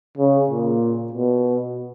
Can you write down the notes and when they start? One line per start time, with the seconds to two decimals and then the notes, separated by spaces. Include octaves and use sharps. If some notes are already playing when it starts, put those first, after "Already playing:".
0.18 C#3
0.50 A#2
1.12 B2